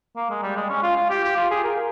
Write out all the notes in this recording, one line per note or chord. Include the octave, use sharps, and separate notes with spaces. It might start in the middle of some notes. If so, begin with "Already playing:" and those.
A#3
G#3
G3
G#3
C#4
F4
F4
G4
G4
F4
G#4
A#4